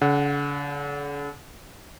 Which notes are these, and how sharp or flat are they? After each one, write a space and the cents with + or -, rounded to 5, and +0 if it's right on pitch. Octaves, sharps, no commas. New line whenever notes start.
D3 -45 F#5 +0